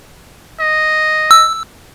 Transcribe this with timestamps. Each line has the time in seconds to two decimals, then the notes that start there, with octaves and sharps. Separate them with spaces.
0.60 D#5
1.31 E6